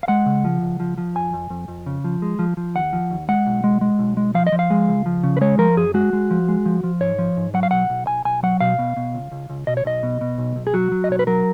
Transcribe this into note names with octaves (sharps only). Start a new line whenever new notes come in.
F5
G#3 F#5
C#3
F3
C#2
F3
F3
F2 G#5
F2
F2
F2
C#3
F3
G#3
F3
F3
D#2 F#5
F3
D#2
G#3 F#5
B1
G#3
G#3
B1
G#3
F3 F5
D#5
F3
F5
G#3
C#2
F3
C#3
B4
G#3 C#5
F3 A#4
F#2 G#4
G#3 F#4
G#3
F3
G#3
F3
F3
G#2 C#5
F3
G#2
F#3 F#5
F5
B1 F#5
B1
B1 G#5
B1 G#5
F#3 F#5
B2 F5
B2
B2
C#2
C#2
C#2
B2 D#5
C#5
B1 D#5
B2
B2
B1
B1
G#4
F#3 F#4
F#3
D#5
B1 C#5
B4
F#3 A#4